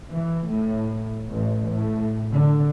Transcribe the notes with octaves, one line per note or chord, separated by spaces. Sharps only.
E3
A2
A1
A2
D3